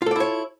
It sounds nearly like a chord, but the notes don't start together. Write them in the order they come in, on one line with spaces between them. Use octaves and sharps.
F4 A4 D5 E4 C#5